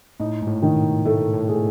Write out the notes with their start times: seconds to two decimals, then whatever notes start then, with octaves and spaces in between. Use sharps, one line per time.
0.20 A2 D#4
0.42 G#2
0.48 A2
0.62 D#3
0.76 B2
1.05 A2 A3
1.34 A2
1.49 G#4